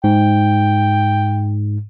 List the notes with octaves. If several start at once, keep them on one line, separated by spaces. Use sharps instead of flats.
G#2 G5